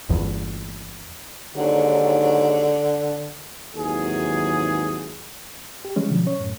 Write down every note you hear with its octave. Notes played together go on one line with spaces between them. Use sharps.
G1 E2
D#2 G#2 D3 F#3
G#1 D#2 E3 F#3 G#4
G4
E3 G#3 C#4
B2 D3 F3 F#3
C#4 C#5
F#2 A2